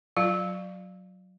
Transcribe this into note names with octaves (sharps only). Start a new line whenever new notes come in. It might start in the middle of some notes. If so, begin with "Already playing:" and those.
F#3 F4 F5